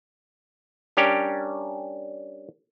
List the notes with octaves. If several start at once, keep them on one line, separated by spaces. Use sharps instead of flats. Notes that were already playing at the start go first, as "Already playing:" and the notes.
G3 C#4 D4 G4 A#4 G5